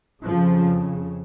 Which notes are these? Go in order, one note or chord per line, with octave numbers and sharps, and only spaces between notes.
F2 C#3 F3